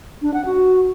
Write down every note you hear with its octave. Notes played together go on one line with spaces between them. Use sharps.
D4
F#5
F#4